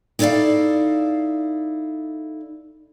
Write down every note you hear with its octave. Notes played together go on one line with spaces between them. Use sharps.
D#4 E4 A4 C#5 D5 F5